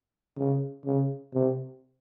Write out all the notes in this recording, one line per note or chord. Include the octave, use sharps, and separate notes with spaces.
C#3
C#3
C3